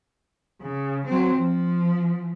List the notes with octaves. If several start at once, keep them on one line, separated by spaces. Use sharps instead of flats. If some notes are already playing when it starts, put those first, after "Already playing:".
C#3
F#3 C4
F3